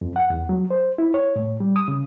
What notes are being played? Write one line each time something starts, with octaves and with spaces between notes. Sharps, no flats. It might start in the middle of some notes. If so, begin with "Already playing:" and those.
F2
F#5
E2
F#3
C5
E4
C#5
A2
G3
D#6
C#3